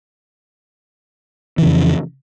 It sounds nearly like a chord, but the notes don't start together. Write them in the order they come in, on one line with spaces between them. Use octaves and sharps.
E3 C#3 F2